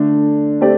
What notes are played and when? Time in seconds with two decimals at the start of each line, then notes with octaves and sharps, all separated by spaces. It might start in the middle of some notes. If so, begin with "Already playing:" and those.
Already playing: D3 A3 D4
0.61 A3 C4 G4 D5